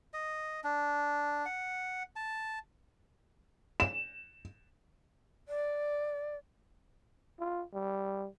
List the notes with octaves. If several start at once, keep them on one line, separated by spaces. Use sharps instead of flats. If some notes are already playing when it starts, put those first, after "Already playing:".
D#5
D4
F#5
A5
E7
D5
F4
G3